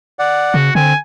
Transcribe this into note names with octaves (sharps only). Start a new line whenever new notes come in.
D5 F#5
C#3 F#4
D3 C4 G#5